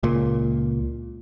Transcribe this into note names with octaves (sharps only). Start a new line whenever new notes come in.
C#2 A#2